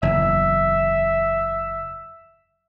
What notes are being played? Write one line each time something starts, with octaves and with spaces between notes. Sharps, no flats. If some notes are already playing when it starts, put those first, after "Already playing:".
F#1 E2 E5